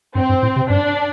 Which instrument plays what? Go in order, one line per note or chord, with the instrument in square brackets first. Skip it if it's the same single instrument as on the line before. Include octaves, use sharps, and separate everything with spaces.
[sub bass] G2 [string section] C4
[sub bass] G2
A2
C3
[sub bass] G2 [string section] D4